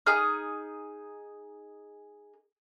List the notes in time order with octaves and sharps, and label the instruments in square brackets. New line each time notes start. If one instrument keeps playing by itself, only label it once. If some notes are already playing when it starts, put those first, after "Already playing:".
[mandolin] D#4 G#4 F6